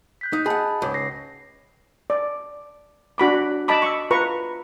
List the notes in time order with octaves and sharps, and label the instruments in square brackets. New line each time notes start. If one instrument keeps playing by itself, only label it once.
[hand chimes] F#6 G6 B6
[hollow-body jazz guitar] D#4 [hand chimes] D#6
[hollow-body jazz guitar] G#4 F#5 [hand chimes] D#5 A5 B5
[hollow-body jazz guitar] C#2 G#2
[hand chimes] A#6 C7
[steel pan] D5
D4 F#4 B5 D6
D#5 A5 B5 D6
C#6 E6
F4 B4 A#5 C#6